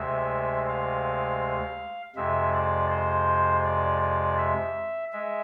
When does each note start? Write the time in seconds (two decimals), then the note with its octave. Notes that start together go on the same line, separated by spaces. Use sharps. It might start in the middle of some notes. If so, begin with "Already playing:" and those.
Already playing: D2 C3 G#3 E5
0.68 F5
2.16 F2 C3 G#3 E5
2.53 D5
2.91 C5
3.64 D5
4.01 D5
4.38 E5
5.13 G#3 E5